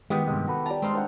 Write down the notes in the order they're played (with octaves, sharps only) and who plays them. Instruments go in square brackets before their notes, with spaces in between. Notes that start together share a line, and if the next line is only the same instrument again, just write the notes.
[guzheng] D#3 B3 [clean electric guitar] G#3 [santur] G4
[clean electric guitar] G2 C3 G#3
F#4 A4 B4
[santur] G3 A5 [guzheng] A#5
[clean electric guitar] G#3 [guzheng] C4 D#4 F5
[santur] D4 C5 F#5